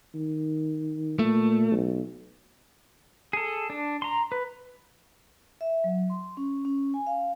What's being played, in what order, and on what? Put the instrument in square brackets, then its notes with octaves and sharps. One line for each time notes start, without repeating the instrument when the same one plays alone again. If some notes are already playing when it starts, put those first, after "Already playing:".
[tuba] D#3
[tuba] A#2 [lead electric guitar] A3
[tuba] B1
[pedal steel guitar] G#4 A4
D4
A#5 C6
B4
[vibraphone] E5
F#3
C6
C#4
C#4
G#5
F5